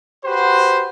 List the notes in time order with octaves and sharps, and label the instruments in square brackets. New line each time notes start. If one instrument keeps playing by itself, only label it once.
[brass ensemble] F#4 G4 B4 C5